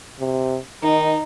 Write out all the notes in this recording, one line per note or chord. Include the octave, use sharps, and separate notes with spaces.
C3
D#3 D#4